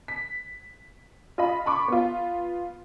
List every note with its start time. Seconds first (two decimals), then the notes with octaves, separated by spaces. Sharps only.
0.08 B6
1.38 F4 D#5 B5
1.66 A5 B5 C#6 D6
1.88 B3 F4